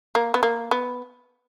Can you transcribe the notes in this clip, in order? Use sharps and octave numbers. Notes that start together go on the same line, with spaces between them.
A#3
B3
A#3
B3